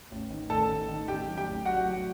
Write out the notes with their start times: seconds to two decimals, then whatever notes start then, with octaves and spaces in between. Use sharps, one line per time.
0.11 A1
0.30 D#3
0.50 A1 A4 A5
0.69 D#3
0.88 D#3
1.08 A1 G4 G5
1.28 F#3
1.37 G4 G5
1.47 A1
1.65 F#3 F#4 F#5
1.86 F#3